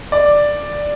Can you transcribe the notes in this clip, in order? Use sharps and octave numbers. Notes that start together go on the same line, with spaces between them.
D5